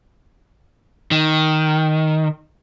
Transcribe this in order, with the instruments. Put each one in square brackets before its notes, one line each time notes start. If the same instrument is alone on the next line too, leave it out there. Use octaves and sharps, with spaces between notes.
[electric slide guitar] D#3